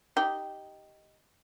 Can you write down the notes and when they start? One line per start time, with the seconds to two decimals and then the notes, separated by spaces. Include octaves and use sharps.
0.17 D#4 G4